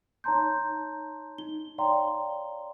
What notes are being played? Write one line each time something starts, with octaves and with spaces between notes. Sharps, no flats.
D#4 C#5 A5 A#5 C6 G6
D#4 G7
C#5 D5 F5 G5 A#5 C6